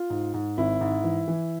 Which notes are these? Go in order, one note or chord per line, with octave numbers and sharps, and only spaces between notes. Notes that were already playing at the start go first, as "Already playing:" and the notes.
Already playing: F4
G#2
G#2
G#1 E4
G#2
E3
E3